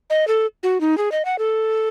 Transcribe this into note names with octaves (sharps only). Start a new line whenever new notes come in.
D#5
A4
F#4
D#4
G#4
D#5
F#5
A4